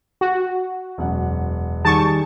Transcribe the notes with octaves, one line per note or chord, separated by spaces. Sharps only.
F#4
E1 F#2 F#5
D#3 G3 G#4 A5 C#6